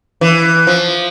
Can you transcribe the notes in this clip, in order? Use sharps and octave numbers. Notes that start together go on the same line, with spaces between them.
E3
F3